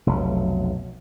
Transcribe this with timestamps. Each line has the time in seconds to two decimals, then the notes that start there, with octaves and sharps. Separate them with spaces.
0.07 F1 B1 B2 F#3